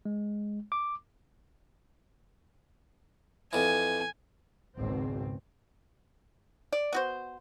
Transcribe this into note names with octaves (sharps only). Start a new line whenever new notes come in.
G#3
D6
F2 E3 G#5
G#1 C#2 B2 C4
D5
B3 F#4 C5